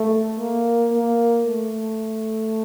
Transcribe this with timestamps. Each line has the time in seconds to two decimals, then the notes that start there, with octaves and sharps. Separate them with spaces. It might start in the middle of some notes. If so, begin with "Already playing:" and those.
Already playing: A3
0.38 A#3
0.92 A#3
1.46 A3